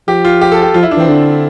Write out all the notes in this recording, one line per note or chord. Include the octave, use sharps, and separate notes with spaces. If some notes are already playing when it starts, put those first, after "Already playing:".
F3 G4
F4
G4
A4
G4
F3 F4
E4
D4
E3 C4
D3